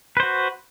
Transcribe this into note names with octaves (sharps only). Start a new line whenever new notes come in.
F#4 B4 C5